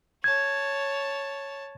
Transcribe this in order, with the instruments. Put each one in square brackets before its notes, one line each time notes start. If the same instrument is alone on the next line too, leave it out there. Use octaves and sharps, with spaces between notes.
[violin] C#5 A5 [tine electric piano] G#6